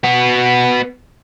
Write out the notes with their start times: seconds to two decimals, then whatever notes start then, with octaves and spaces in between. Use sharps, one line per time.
0.04 B3 F#4